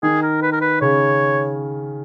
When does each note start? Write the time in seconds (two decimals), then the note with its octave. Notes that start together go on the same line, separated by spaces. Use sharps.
0.03 D#3 G#4
0.22 A#4
0.42 B4
0.52 A#4
0.61 B4
0.81 C#3 C#5